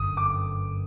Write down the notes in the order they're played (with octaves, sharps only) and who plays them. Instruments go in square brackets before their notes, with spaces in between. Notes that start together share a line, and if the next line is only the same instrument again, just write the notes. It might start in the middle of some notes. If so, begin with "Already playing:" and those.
Already playing: [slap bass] G1 F#2 D3 [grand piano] D#6
[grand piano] D6